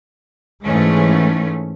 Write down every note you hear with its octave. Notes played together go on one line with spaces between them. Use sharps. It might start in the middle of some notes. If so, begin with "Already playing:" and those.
G#2 E3 G#3 A3 C#4